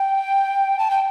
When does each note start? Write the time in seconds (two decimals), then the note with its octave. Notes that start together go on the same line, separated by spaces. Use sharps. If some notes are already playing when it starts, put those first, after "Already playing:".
Already playing: G5
0.79 A5
0.91 G5